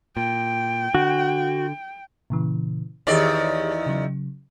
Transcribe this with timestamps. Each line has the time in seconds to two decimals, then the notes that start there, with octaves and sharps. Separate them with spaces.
0.17 A#2 G5
0.95 D3 F#4
2.30 A#2 C#3 E3
3.07 E2 D#3 G4 G#4 C#5 D5
3.86 C#3 F#3